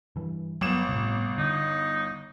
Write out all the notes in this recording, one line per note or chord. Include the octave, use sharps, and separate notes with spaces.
G2 E3
G1 F#3 B3 E7
A2 C3
D3 D#4